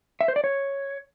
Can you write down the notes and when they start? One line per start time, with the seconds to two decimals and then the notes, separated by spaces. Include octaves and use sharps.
0.21 E5
0.28 C5
0.36 D5
0.44 C#5